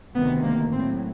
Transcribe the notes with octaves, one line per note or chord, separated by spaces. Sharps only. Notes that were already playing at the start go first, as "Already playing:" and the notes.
D2 C3 D#3 B3
A#3
A2 F#3 C4